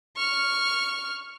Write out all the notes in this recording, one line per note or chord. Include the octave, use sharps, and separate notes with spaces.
C#6 F6